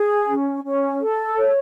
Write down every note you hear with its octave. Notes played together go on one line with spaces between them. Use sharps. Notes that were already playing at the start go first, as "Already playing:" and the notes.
Already playing: G#4
C#4
C#4
A4
C#5